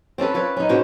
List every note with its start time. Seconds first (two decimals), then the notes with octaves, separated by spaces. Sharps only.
0.18 C4 C#4 A4 B4
0.34 F4 A4 B4 C#5
0.57 C#4 D#4
0.69 G#2 B2 C#4 C5